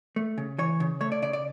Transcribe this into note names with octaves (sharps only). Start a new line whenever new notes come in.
A3
C#3
E3 C#5
C#3
A3 C#5
D5
C#3 D5
D5